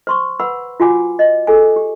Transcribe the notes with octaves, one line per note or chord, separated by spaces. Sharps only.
C5 C6 C#6
B4 F#5 B5 E6
F4 F#4 F#5 G#5 D6
D#5
G#4 A4 G#5
G4